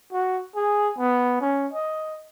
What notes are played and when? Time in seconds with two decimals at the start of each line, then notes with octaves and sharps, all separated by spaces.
0.13 F#4
0.55 G#4
0.98 B3
1.41 C#4
1.73 D#5